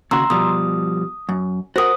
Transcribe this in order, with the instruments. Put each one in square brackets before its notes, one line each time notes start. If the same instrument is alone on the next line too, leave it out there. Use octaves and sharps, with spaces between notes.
[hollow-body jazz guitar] D#2 C#3 F#4 [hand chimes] A#5 C6 E6
[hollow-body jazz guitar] B2 F3 G3 [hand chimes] D#6
[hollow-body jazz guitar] F#2
[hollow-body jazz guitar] F#4 A#4 F#5 [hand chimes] C5 D#6